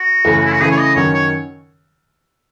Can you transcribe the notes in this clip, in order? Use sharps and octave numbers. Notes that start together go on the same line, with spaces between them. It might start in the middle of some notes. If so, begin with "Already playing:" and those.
Already playing: F#4
F#2 C#3 E3 A3
E4
F#4
C#3 E3 A3 G#4
C#5
D#5
F#2 D#3 F#3 C#4 C#5
C#5